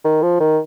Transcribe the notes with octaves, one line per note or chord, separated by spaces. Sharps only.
D#3
F3
D#3